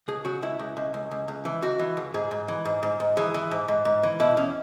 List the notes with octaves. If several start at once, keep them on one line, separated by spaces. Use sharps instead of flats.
C#2 G#4
C#3 F#4
C#2 E4
C#2
C#2
C#2
C#2
C#2
E3
C#2 F#4
E3
C#2
G#2 G#4
G#2
E3
G#2
G#2
G#2
E3 G#4
E3
G#2
G#2
G#2
E3
B2 E4
E2 C#4